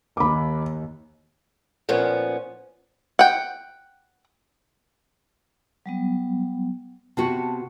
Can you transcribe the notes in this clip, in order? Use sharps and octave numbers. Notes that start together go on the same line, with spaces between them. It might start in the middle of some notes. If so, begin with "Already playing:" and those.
D#2 B5 D6
A#2 F3 B3 C#4
F#5 G5
F#3 G3 B3
C3 B3 F#4 A5